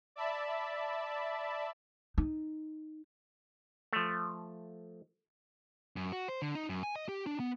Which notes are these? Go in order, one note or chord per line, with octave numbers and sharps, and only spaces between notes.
D5 E5 A5 B5
D#4
F3 A3
F#2
F#4
C5
D3
D#4
F#2
G#5
D#5
G4
D4
B3